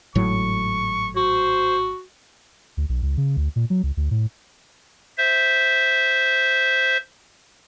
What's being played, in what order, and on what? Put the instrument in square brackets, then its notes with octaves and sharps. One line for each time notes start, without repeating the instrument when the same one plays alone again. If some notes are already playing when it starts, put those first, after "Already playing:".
[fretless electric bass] G#1 A2 F#3 [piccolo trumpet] C#6
[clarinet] F#4 [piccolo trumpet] C5
[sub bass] D2
B1
C#2
C#3
D2
A#2
F#3
C#2
D2
A2
[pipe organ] C5 E5